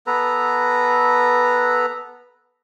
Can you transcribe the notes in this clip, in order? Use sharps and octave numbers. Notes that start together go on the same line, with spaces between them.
B3 A4 B4 A#5